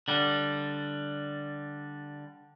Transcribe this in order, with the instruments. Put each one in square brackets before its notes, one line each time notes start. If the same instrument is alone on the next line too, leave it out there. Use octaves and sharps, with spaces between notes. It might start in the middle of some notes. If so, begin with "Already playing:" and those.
[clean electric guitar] D3 G3